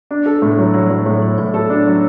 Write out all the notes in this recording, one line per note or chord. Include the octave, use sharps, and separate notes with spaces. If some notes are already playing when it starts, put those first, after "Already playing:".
D4
A4
A2
F#3
F#3
F#3
A2
F#3
A2
A4
D4
F#3